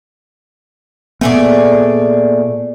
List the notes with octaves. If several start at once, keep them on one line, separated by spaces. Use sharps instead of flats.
A#2 A3 B3 G#4 D5